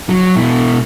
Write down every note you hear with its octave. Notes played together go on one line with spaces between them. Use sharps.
F#3
B2 E4